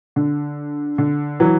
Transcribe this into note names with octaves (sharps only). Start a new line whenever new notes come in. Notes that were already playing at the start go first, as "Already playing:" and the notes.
D3
D3
E3 F#3